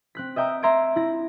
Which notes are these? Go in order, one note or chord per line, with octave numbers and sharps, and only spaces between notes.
C4 F#6 B6
D#5 E5 G5 A#5 D#6
E5 A#5 C6 G#6 D7
E4 A#6